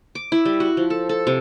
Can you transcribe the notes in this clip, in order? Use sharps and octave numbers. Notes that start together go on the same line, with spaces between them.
D6
E4
G3
F#4
F3
A4
A4
C3